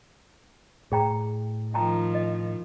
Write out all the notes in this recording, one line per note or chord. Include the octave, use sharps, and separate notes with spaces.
A2 G#4 G5 A#5
D#3 F3 G5 A5 A#5
D#5